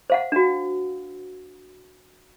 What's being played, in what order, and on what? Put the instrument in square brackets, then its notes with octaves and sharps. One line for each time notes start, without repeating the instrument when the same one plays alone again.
[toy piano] C5 F5 F#5
D4 F#4